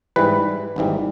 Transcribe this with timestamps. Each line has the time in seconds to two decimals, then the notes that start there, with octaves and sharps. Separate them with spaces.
0.16 G#2 E3 G3 B4
0.76 G#1 G#2 E3 G3 A#3